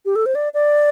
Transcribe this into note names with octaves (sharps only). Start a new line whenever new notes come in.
G4
A4
C5
D5
D5